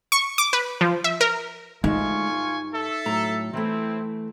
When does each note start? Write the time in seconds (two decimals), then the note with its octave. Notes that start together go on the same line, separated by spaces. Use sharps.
0.12 C#6
0.38 D6
0.53 B4
0.81 F3
1.04 E5
1.21 A#4
1.84 D2 G#3 D#4 F4 E5 G#5 C#6
2.30 G2
2.73 A4 E5
3.05 A2 F#3 A#5
3.53 E3 A3 C4 E4